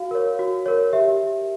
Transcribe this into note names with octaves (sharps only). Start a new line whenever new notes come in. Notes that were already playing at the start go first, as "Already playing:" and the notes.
Already playing: F#4 F5
A#4 C#5
F#4
A#4 C#5
G4 E5